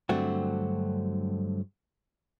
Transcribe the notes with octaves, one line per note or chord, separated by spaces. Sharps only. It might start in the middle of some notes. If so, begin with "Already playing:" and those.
G2 D3 F#3 A3 C4 F#4